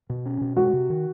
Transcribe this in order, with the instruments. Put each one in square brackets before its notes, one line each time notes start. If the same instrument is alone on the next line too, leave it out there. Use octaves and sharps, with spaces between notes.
[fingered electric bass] B2
C#4
B2
[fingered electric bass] G#3 [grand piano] F#4
[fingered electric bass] C3
D#3